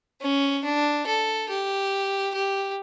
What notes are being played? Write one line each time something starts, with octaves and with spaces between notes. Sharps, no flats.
C#4
D4
A4
G4
G4